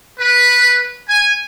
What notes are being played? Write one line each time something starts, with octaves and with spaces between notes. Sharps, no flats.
B4
G#5